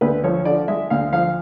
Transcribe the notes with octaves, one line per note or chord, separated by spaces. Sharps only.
D2 B4
F3 C#5
D3 D5
G#3 E5
D2 F5
F3 F5